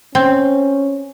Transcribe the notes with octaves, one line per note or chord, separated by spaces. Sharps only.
C4 C#4